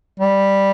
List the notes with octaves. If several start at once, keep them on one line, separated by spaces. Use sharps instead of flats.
G3